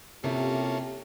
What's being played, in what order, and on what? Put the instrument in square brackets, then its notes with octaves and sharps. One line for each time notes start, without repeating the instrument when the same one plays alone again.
[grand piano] C3 [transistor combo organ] A#3 C#4 A4 [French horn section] E4 F4 G4